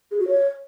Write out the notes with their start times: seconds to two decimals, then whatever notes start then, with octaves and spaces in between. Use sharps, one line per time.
0.11 G#4
0.20 F#4
0.28 C#5